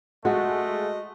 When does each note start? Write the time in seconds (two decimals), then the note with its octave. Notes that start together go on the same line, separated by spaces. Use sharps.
0.25 G#3 A3 F#4 D#5